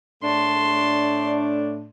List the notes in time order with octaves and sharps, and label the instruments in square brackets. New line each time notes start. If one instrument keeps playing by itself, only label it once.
[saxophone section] A2 A3 D4 [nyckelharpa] A5 C6